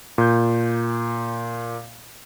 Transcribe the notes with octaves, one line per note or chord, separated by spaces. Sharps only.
A#2 G6